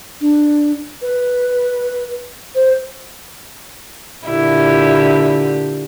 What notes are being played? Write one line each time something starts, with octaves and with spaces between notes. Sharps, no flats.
D4
B4
C5
A#2 D3 E4 G4